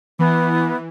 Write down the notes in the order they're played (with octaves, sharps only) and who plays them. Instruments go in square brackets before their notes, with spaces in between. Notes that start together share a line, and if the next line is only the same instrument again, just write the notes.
[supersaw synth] E3 [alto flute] B3